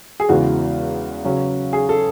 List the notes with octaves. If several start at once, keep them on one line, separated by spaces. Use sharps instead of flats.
G#4
E2 C#3 E3 G#3 B3 F#4
C#3 F#3 C#4
G#4
A4